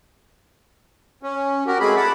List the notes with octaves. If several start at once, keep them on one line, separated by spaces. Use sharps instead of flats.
C#4
F#4 G4 A#4
G#3 A3 C4 G#4 B5
F#5 A5 B5 D6